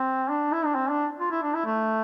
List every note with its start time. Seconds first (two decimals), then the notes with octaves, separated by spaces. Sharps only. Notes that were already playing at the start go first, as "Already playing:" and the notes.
Already playing: C4
0.30 D4
0.52 E4
0.65 D4
0.75 C4
0.90 D4
1.20 F4
1.31 E4
1.43 D4
1.54 E4
1.65 A3